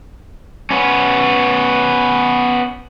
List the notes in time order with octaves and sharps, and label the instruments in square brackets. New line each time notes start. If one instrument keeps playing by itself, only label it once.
[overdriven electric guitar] B3 C#4